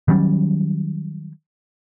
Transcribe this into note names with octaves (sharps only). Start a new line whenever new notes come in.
D#3 F#3 G3 C#4